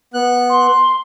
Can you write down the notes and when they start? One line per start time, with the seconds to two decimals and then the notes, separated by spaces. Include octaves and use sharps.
0.14 B3 F#6
0.50 C6